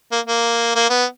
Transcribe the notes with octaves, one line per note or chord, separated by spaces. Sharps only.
A#3
A#3
A#3
B3